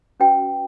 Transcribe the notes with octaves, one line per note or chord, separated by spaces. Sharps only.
C#4 F#4 B4 G5